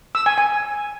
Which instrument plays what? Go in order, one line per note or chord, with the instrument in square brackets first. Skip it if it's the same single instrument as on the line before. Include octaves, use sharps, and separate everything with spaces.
[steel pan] E6
G#5
G#5